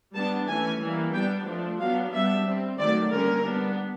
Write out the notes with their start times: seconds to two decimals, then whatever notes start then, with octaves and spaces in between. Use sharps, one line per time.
0.15 G3 B3 D4 A5
0.47 E3 A3 C#4 G#5
0.81 E3 G3 A#3
1.14 G3 B3 D4 G5
1.47 F3 A3 D4
1.80 F#3 B3 D4 F5
2.13 G3 B3 D4 E5
2.46 G3 C4
2.79 D#3 F#3 A3 D5
3.11 D3 G3 A#3 C#4 A#4
3.45 G3 B3 D4